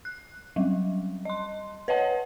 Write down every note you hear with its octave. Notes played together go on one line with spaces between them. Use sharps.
F#6
F#3 G3
D#5 C6
B4 C#5 D#5 F#5 A5